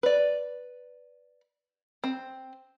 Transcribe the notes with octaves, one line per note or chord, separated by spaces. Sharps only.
B4 D5
C4